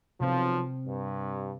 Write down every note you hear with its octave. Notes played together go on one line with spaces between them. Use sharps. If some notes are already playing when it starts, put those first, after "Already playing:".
B1 C3 F3 C4
G2